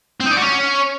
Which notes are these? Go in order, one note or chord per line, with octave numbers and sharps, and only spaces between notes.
C4
D#4
D5
F#4
C#4